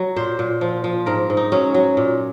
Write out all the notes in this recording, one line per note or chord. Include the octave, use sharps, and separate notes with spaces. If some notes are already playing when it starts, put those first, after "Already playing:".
Already playing: F#3
A#2 C5
A#2
F3
F3
G#2 A#4
G#2
D#4
F#3 C#4
F#3
A#2